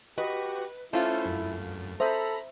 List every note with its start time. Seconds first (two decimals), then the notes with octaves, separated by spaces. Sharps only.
0.18 F#4 G4 B4 D#5
0.93 A3 C#4 E4 F4 C5 E5
1.26 F#2
2.00 A4 C5 E5 A#5 B5 D#6